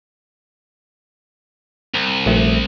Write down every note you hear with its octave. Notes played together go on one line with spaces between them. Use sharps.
C2
A#1 A3